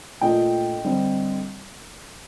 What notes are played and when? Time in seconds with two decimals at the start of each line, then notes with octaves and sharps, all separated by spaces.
0.21 A#2 A3 D4 D#5 G5
0.84 D3 G3 C4